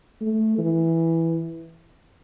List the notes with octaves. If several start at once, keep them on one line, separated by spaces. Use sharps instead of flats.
A3
E3